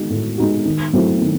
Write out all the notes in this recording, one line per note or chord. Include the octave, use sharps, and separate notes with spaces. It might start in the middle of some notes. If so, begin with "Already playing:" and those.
Already playing: G#3 D#4 F#4
A2
G#3 D#4 F#4
D#3
F#3 A3 C4 E4
D#3